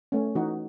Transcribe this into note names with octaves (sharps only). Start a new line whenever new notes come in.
A3 C#4
E3 D#4 F#4